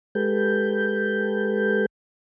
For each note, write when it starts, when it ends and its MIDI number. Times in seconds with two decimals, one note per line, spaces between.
0.15 1.86 56
0.15 1.86 67
0.15 1.86 69
0.15 1.86 71
0.15 1.86 91